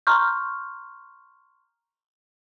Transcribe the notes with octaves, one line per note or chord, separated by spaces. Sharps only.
A#5 C6 C#6 F6 G6